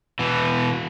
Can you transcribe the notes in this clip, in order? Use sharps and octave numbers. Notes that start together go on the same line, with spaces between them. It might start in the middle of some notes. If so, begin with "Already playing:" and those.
B2 E3